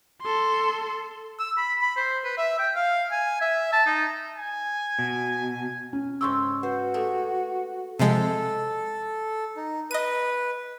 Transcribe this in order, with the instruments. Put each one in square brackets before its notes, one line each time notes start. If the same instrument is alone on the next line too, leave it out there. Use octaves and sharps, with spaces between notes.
[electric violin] A4 C6
[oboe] E6
B5
B5
C5
B4
E5
G5
F5
G#5
E5
A5
D#4
[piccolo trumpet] G#5
[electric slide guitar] B2
[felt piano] C#4
[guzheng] G#2 C#3 G5 [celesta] C6 C#6 E6
[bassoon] F#4 [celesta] B4 [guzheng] C5
[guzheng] G#3 A3 G4
[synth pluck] C3 F3 G#3 [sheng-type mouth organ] A4
[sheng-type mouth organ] D#4
[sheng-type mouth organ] B4 [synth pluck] D#5 D#7